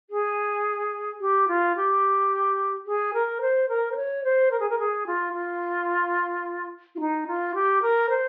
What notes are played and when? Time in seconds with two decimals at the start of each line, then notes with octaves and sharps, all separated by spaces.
0.10 G#4
1.20 G4
1.47 F4
1.76 G4
2.86 G#4
3.13 A#4
3.41 C5
3.68 A#4
3.91 C5
3.96 C#5
4.24 C5
4.51 A#4
4.59 G#4
4.69 A#4
4.79 G#4
5.06 F4
5.33 F4
6.95 F4
6.99 D#4
7.27 F4
7.54 G4
7.81 A#4
8.09 C5